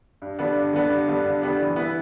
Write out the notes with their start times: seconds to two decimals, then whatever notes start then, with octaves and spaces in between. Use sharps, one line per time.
0.22 G2
0.39 D3 G3 B3 D4
0.55 G2
0.73 D3 G3 B3 D4
0.90 G2
1.08 D3 G3 B3 D4
1.25 G2
1.42 D3 G3 B3 D4
1.60 E3
1.76 B3 E4 B4